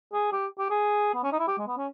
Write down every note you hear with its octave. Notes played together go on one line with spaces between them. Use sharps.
G#4
G4
G4
G#4
B3
C#4
D#4
E4
G4
G#3
B3
C#4